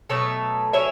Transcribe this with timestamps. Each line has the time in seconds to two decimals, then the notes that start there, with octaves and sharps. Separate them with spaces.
0.09 B2 F#3 A3 A4 C#5
0.73 F#3 C#4 E4 C#5 E5